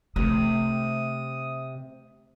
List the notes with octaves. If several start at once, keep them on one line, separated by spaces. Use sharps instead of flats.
C3 A3 D#6